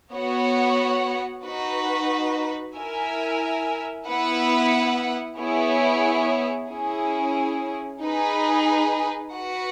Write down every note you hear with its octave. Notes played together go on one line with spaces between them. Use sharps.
B3 F#4 C#5 F#5
D#4 F#4 B4
E4 A#4 E5 G#5
B3 E4 B4 F#5
B3 E4 G#4 C#5
C#4 E4 G#4
D#4 G#4 B4
F#4 B4 F#5